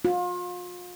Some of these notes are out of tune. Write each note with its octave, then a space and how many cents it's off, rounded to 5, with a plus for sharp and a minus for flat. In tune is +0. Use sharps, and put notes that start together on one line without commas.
F4 +35